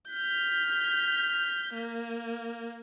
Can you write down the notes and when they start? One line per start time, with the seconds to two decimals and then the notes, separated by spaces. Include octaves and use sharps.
0.11 F6 G6 B6
1.74 A#3